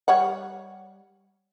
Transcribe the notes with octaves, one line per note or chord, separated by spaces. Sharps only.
G3 C#5 F#5